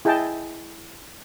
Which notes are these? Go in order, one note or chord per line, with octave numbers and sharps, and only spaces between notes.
E4 G#4 D#5 G5 A5